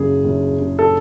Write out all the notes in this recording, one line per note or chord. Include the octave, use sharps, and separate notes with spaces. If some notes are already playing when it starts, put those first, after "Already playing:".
Already playing: F#1 C#3 G#4
F#1
C#3
A4